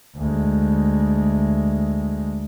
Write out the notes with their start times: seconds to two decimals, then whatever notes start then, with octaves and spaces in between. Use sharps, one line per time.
0.17 D2 G#3